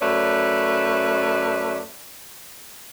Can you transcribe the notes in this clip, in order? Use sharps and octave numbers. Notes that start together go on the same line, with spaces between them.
F#2 A3 B4 C#5 D5